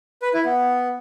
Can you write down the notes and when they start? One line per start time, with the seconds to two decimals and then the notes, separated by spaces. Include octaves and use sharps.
0.22 B4
0.34 E4
0.45 B3